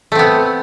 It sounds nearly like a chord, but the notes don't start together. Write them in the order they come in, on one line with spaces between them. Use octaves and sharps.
A3 C4 B3